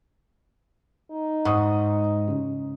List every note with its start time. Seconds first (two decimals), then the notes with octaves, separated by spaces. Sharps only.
1.11 D#4
1.45 G#2 F#5 C#6 D#6
2.28 C#3